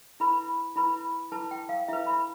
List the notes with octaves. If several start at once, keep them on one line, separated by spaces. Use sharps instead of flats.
E4 B4 B5
E4 B4 B5
E4 B4 A5
G5
F5
E4 B4 E5
B5